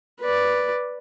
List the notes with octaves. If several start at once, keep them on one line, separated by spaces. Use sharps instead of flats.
B4 D5